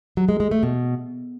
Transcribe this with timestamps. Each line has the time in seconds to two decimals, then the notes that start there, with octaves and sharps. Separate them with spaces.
0.17 F#3
0.29 G#3
0.40 G#3
0.51 A3
0.63 B2